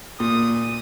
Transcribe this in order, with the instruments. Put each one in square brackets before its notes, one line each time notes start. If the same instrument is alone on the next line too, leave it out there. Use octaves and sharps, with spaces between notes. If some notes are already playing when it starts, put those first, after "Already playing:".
[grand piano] A#2 [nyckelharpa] D#6